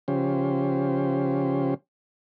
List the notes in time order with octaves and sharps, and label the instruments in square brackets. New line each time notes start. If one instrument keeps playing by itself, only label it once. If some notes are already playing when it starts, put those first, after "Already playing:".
[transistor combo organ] C#3 F3 C#4 G4 C5